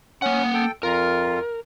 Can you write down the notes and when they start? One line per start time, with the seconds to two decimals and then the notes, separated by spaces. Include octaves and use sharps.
0.22 A#3 C#4 F#5
0.54 A4 G5
0.83 F2 F4 A#4